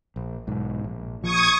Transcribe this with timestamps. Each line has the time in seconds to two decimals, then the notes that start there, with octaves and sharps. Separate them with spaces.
0.16 A#1
0.47 B1 G#2
0.84 A#1
1.22 A#1 F3 C#6 D#6 G#6